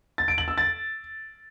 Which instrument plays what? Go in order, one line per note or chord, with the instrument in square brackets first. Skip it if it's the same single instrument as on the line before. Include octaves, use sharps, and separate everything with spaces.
[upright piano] A6
D7
F#7
E6
A6